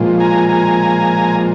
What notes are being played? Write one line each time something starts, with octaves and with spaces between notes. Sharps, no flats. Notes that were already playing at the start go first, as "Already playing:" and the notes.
Already playing: A#2 F3 G#3
G#5 A#5
G#5 A#5